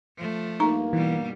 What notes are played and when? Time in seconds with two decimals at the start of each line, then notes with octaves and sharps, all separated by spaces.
0.17 F3 A3
0.60 G2 A#3 D#4 A#5
0.93 B2 E3 G3